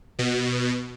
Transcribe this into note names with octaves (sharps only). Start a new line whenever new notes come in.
B2